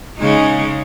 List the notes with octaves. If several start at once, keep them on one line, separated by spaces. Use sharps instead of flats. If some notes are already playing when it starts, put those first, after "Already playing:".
C#3 G#3 D#4